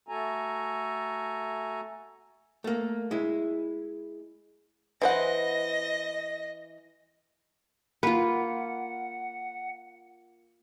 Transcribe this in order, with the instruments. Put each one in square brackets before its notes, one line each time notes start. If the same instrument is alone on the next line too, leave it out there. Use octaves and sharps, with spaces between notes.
[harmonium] A3 F#4 A4 G#5 A#5
[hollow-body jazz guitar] A3 A#3
G#3 E4
[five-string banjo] E3 C5 F#5 [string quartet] D#5 A#6
[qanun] A#3 F4 [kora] B4 [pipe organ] F#5